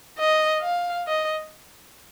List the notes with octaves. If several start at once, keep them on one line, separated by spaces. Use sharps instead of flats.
D#5
F5
D#5